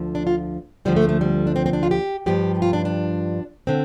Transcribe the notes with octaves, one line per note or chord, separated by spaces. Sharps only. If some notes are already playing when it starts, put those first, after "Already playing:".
Already playing: D2 D3 F3
D4
F4
D2 D3 F3 G3
A3
A3
G3
D4
C4
C4
D4
F4
G4
G2 F3 G4
F4
D4
D4
D3 C4